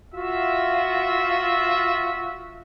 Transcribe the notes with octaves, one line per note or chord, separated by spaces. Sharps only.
F4 F#4 E5